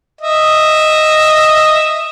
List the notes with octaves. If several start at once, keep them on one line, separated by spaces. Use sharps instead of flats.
D#5 E5